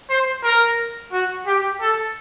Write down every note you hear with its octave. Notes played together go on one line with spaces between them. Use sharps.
C5
A#4
F#4
G4
A4